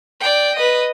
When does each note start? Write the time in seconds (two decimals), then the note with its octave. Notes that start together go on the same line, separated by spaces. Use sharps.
0.21 D5 G5
0.56 B4 D#5